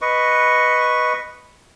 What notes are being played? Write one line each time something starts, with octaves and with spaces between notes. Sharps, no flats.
B4 D#5 C#6